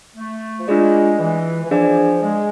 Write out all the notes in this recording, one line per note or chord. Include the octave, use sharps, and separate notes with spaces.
A3
F3
G#3 D4 F4 G#4 D5
E3
E3
F3 D4 G#4 D5 F5 G#5
G#3